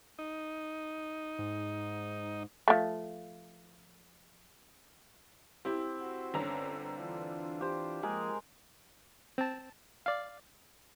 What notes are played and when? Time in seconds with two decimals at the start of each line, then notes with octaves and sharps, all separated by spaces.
0.19 D#4
1.39 G#2
2.68 F3 A3
5.65 C4 E4 G4
6.00 F#4 C5
6.34 G1 D3 C#4 A#5
6.98 E3 D4 F4
7.61 G4 C5
8.03 F3 G#3 A#3 G#4 A#4
9.38 C4 A5
10.06 D5 F5